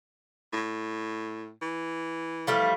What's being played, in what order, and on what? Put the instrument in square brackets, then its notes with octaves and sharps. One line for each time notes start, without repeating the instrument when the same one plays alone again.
[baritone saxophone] A2
E3
[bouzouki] F3 G3 A3